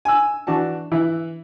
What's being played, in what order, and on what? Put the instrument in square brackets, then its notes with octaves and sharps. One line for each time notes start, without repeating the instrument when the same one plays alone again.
[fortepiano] G#5 E6
E3 D4 F#4 A5
E3 E4